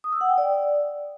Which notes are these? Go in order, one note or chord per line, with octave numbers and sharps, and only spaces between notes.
D#6
E6
F#5
G5
D5